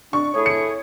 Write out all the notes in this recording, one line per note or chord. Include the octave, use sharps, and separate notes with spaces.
D4 C#6
A3 E4 G#4 C#5
C#7